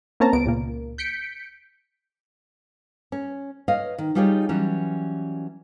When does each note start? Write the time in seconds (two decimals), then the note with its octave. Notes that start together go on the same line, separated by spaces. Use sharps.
0.20 A#3 C4 C#4 A5 A#5
0.33 C#2 B3 D7
0.45 C#2 A#2 A#3
0.98 G6 B6 C#7 D7
3.12 C#4
3.68 B4 C#5 D#5 F5
3.98 D#3
4.15 G3 D#4 F4 G4 G#4 C#5
4.49 E3 F#3 G3 C#4